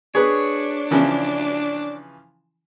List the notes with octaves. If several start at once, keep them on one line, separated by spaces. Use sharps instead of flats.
D4 G#4 B4 C#5
C#3 E3 F3